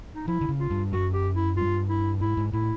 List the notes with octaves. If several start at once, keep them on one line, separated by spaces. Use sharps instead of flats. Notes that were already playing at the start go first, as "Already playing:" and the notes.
D#4
F3 E4
D3
C#3
F4
G2
F#2 F#4
G4
E4
G2 F4
E4
G#2 E4
G#2
A2 E4